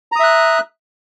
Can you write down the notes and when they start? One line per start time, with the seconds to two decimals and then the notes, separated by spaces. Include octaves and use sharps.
0.12 A#5
0.16 D#6
0.20 E5
0.23 F#6